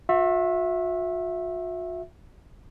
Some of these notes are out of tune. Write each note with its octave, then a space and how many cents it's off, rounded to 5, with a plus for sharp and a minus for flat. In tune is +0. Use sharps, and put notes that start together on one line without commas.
F#4 -45 E5 +0